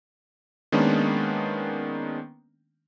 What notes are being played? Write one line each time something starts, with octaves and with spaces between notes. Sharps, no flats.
D#3 G#3 A#3 B3 C#4 D4